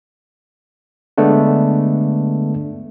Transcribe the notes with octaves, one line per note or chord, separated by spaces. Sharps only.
D3 G#3 A3 B3 D4